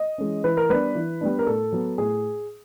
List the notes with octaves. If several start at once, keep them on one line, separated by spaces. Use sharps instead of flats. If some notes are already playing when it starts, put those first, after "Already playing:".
Already playing: D#5
E3 G#3 C#4
E3 B4
A#4
G3 B3 D4 B4
E3
G3 B3 D4
A#4
A2 A4
F#3 B3
A2 G#4